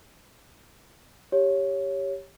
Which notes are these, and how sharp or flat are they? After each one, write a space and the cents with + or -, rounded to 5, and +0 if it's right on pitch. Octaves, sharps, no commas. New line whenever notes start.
G4 +0 C#5 +0